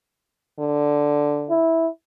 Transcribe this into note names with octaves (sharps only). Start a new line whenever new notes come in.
D3
E4